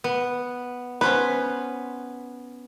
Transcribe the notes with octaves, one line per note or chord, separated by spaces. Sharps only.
B3
B3 C#4 B4 C5